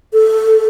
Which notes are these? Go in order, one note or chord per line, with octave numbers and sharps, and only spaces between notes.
A4